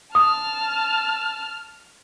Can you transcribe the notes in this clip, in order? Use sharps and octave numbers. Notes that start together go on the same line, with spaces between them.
A5 D#6 F6